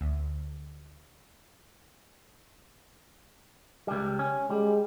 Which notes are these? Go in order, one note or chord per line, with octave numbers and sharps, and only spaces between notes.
D2
C#2 G3
C#4
G3 G#3